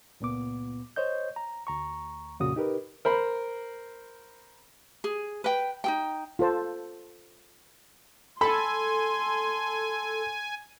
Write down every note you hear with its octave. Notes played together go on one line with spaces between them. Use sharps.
C#2 A#2 B3 D6
C5 C#5 D#5 G6
A#5
D2 A#5 C#6
F2 A#2 C#3 F#4 D#6
D#4 G4 A#4 B4
A#4 C5 B5
G#4
B4 G5
D#4 G#4 G5
F4 A4 C5 A5
A4 G#5 B5 C6